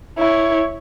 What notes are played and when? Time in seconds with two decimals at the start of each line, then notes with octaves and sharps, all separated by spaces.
0.18 E4 C#5